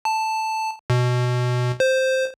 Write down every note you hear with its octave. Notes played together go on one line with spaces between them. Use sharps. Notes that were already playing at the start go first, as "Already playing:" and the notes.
A5
B2
C5